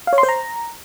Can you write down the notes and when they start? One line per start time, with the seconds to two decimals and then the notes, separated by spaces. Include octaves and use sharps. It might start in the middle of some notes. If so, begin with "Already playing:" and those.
0.07 F5
0.13 C#5
0.18 C6
0.23 C5
0.29 A#5